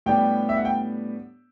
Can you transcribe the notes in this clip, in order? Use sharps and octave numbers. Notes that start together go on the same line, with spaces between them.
A2 G3 B3 D4 G4 G5
E5
F#5
G5